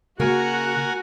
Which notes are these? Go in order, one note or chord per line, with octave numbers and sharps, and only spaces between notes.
C#3 A#3 F#4 A#4 F#5 G#5